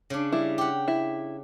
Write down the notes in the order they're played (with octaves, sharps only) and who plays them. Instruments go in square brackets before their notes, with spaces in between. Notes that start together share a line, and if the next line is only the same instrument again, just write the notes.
[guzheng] C#3 D4
[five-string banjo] G3 E4
[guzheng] G4 F#5
[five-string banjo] E4